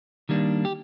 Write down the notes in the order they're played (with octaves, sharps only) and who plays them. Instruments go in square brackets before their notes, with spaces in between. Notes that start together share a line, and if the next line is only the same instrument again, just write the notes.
[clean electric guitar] D#3 G3 A#3 D4
G4